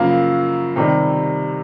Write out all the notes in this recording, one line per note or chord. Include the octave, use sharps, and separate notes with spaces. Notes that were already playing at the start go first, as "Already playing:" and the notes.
Already playing: F#2 C#3 F3 A#3
C3 D#3 G3